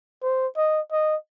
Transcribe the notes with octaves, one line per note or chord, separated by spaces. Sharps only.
C5
D#5
D#5